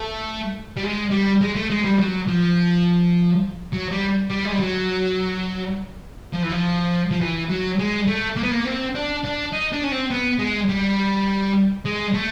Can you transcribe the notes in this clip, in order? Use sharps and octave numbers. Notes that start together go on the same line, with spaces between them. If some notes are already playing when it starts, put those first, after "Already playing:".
Already playing: A3
G3
G#3
G3
G#3
A3
G#3
G3
F#3
F3
F#3
G3
G3
G#3
G3
F#3
F3
E3
F3
F3
E3
F#3
G#3
A3
A#3
B3
A#3
C4
D4
D4
D#4
D4
C#4
C4
B3
G#3
G3
G#3
A3